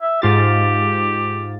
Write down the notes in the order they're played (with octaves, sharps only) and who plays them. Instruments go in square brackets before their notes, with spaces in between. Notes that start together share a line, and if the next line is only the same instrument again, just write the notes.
[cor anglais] E5
[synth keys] G#2 F4 A6 [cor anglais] G4